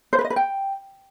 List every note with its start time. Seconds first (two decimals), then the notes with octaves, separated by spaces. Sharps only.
0.13 C5
0.19 B4
0.24 D#5
0.30 B4
0.36 G5